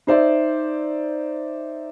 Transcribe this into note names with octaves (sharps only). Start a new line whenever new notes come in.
D#4 C5 D5 E5